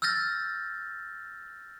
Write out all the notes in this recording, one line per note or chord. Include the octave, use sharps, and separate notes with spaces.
E6 F6 G6 A6 A#6